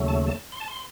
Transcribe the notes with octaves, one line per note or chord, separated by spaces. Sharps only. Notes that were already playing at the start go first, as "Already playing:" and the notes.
Already playing: D#2 C#3 F#3 A3
A5
A5
C6
A5
C6